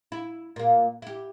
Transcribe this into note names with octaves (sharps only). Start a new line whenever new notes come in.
E4
A#2 A#3
E4 G4